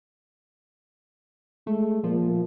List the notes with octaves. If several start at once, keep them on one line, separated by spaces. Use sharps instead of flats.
G#3 A3
A#2 F3